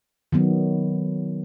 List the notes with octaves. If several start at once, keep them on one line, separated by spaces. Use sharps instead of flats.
D#3 F#3 B3